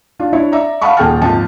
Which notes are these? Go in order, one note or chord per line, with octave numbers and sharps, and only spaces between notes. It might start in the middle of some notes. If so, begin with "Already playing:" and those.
D4 F4
D4 E4 C#5
D5 E5 A#5
F5 F#5 A5 B5 C#6
D#1 G#4 F#5 G5 A5 F6
G#1 F3 A5